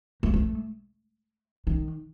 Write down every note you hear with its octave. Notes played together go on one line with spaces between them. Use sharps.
A#3
A3
D#3